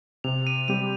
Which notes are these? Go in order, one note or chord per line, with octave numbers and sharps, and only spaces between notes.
C3 F7
D#7
G3 C4 G4 D#7